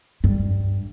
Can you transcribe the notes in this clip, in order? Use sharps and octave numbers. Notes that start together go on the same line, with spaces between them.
G2